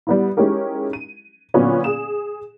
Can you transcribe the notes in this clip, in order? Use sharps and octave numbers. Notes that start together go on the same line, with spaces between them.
G3 B3 E4
G#3 C#4 D#4 E4 G4 A#4
D#7
A#2 D3 F#3 B3 C#4
G#4 D#6 E7